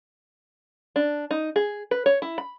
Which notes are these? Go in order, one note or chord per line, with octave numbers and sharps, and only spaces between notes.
D4
D#4
G#4
B4
C#5
E4
B5